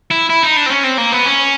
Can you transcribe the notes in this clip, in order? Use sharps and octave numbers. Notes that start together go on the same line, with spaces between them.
E4
E4
D#4
D4
C4
C#4
C4
A#3
B3
C#4